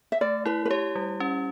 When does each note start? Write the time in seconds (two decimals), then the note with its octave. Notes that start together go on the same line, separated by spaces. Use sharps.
0.12 E5
0.21 A3 D5
0.46 E4 B4
0.65 B4
0.70 G4 C#5
0.96 G3
1.20 C#4